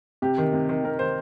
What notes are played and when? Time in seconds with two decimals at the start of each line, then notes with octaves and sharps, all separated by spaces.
0.22 C3 G4
0.38 D#3
0.53 C3
0.69 D#3
0.84 C3 A#4
0.99 D#3 C5